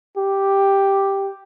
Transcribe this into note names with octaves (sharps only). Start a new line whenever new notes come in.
G4